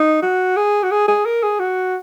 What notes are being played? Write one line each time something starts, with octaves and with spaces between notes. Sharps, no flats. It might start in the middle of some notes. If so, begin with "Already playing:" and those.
Already playing: D#4
F#4
G#4
F#4
G#4
G#4
A#4
G#4
F#4